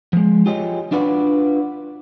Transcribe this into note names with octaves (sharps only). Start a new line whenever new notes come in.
F3 G#3
F4 G4 G#4 C#5 D#5
D4 F4 F#4 B4 D5